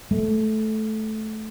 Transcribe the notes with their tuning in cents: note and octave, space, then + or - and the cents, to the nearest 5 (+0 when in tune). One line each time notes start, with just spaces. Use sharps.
A3 -15